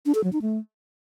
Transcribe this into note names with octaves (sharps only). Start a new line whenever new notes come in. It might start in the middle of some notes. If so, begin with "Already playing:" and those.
D4
A4
F#3
D#4
A3